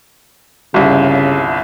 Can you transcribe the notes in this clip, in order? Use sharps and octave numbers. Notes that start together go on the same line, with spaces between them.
G1 C2 C#3